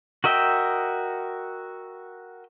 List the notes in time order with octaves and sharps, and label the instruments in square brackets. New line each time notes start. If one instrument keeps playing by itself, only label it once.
[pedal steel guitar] F#4 A#4 D#5 E5 G5